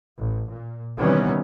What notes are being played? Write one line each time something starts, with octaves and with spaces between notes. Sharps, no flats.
A1
A#2
C3 D#3 E3 G3 B3 C#4